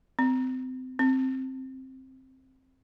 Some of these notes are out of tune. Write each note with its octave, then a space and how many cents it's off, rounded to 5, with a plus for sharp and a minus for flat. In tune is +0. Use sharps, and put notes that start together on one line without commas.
C4 -30
C4 +10